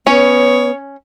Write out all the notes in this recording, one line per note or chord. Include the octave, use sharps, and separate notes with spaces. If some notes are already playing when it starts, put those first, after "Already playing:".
B3 C#4 C#5